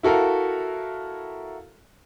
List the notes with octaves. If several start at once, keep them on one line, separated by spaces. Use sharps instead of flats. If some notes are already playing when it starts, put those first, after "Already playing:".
E4 F#4 A4 A#4 F5